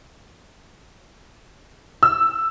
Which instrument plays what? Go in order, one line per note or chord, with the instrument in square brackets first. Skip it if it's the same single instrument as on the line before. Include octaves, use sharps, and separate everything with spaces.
[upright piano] E6